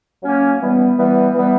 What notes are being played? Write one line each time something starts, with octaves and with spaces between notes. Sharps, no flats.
F#3 A#3 C#4
E3 G3 B3
E3 G3 B3
E3 G3 B3